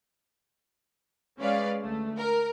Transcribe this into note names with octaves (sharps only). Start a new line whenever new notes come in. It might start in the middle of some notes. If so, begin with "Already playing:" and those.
G#3 C#4 B4 D5 F5
D2 A3
A#4